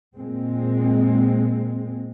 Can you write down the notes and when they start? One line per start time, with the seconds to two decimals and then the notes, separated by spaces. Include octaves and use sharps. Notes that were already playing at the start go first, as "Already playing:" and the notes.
0.16 A#2 G#3 C4